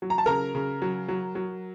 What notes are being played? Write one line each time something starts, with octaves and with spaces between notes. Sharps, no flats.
F#3
A#5
A5
C#3 A#4 A#5
C#3
F#3
F#3
F#3